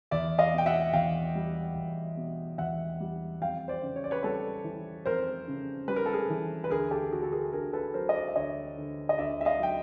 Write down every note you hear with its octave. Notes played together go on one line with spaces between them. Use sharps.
E2 D5 E5
D#5 F5
B2
G5
E5 F#5
E2 F5 G5
G3
E2
B2
E2 E5 F#5
G3
F2 F5 G5
C5 D5
C#3
C#5
D5
B4 C#5
G3 A4 B4
E3
F2 A#4 C5
C#3
G3 B4
A#4
A4
G#4 A#4
E3
B4
D2 G#4 A#4
G4 A4
D3 F#4 G#4
A4
G#4 A#4
D2 G#4 A#4
A4 B4
F#3 A#4 C5
D#5
C5 D5
E5
D2 C#5 D#5
D3
D#5
D2 D5 E5
E5
D#5 F5
F#3 G5